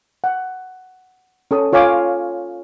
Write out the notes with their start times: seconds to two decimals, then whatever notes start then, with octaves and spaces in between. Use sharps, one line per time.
0.24 F#5
1.51 C#4 A4 D#6
1.73 F4 C#5 F5 G#5 D6